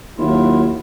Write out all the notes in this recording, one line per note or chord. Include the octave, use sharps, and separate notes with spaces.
D#2 F#3 E4 F4